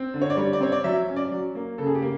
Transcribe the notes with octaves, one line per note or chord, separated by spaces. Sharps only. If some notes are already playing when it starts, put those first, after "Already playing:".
Already playing: C4
D3
C#5
D5
G3 C#5
D5
C4 C#5
D5
F#3 E5
C#4
D5
F#3
A#3
C#3 A4
G#4
G4
A#3